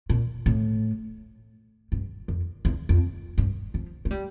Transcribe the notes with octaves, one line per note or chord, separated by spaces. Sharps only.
A#2
A2
G2
F2
E2
F2
G2
F3
A3
G3